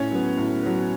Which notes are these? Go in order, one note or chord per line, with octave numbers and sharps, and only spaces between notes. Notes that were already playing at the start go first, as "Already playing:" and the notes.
Already playing: A2 C#4 C#5
F#3 B3
A2
F#3 B3